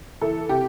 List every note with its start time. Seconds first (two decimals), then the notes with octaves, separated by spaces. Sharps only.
0.21 E3 A4
0.49 C3 G4